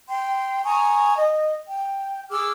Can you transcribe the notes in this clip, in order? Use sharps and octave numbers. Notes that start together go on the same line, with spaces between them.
G5 C6
G#5 A#5 C#6 D#6
D#5
G5
G#4 D6 E6 F6